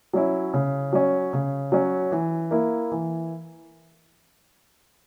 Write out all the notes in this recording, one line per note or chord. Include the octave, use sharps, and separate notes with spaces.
F#3 C#4 E4
C#3
F#3 C#4
C#3
F#3 C#4
E3
A#3 E4
E3